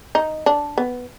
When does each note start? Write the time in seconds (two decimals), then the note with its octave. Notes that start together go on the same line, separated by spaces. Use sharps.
0.15 D#4
0.46 D4
0.78 B3